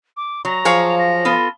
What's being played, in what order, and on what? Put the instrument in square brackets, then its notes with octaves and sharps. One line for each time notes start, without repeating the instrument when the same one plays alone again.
[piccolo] D6
[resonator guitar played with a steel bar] F#3 [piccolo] A#5
[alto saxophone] F3 [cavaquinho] G#4 C#5 F5
[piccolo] A#6
[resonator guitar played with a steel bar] B3 F4 A4